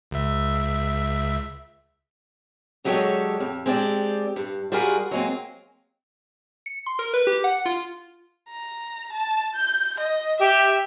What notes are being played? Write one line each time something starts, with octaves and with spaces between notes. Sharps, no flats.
C#2 E5
D3 F#3 G#3 G4 A4 C#5
F2
G#3 C4 D4 G4 D5
G2
G3 F4 F#4 G#4 A#4
F#3 G#3 A#3 C4
C#7
C6
A#4
B4
G4
F#5
F4
A#5
A5
G6
D#5
G4 E5